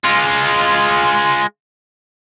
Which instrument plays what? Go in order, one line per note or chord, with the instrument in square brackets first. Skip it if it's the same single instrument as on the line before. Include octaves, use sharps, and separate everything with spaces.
[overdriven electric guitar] G#3 F4